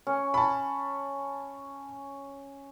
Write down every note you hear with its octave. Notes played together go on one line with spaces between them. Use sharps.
C#4
A5 B5